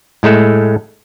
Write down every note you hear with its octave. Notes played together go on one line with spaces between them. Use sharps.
A2 G#3 A3 A4